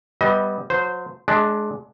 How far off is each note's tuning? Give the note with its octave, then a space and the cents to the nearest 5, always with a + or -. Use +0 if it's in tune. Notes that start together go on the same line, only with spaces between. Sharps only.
G3 +0 B3 +0 D#5 +30
F#3 -35 C5 -10
G#3 +25 D4 +0